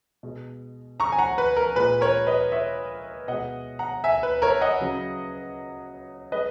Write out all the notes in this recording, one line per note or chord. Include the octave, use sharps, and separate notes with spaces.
B2 G#3
A#5 C#6
G#5
F#5 A#5
B4
A#4
A#2 G#3 B4
A#4 C#5
B4 D#5
C#5 E5
B2 G#3 D#5 F#5
F#5 A#5
E5 G#5
B4
A#4 C#5
D#5 F#5
C#3 F#3
G#3 B4 D#5